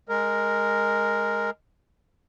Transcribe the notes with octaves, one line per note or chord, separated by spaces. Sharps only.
G#3 A#4